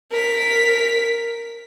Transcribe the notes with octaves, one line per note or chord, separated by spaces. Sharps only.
A#4 B6